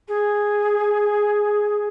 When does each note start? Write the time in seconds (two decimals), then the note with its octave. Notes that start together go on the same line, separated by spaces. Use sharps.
0.08 G#4